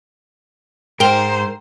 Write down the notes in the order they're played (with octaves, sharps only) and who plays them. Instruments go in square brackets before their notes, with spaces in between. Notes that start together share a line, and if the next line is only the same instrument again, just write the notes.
[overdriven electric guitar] G#2 [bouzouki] A#4 [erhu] C5 [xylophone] G5 G7